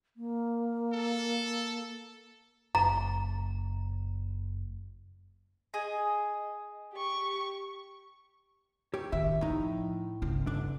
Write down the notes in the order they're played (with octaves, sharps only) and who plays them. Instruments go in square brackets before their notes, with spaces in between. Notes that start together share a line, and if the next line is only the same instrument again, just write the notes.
[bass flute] A#3
[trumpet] A4
[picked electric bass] F#1 [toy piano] A#5
[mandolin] G#4 D#5
[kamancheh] G4 C#6
[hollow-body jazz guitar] G4 C#5
[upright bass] A1 D#3 [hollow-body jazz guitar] E5
[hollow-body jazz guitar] A2 D#4 [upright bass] F3
[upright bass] G1 C#3
[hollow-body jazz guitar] D4